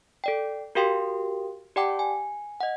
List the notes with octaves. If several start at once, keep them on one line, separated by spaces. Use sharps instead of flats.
A4 D5 G5
F#4 G4 A#4 F5 G5 C6
G4 D5 F#5 G5 A5 D6
G#5
D#5 F#5